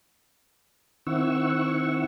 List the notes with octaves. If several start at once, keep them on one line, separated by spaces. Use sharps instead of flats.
D#3 C4 E4 F#5 C#6 E6